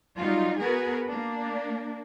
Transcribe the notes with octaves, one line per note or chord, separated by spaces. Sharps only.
F#3 G3 D#4 F4
B3 F#4 G#4 A#4 B4
A#3 D4